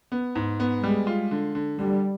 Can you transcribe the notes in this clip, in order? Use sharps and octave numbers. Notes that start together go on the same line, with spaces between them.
B3
G#2
B3
G3 G#3
F4
D3
D3
D3 G3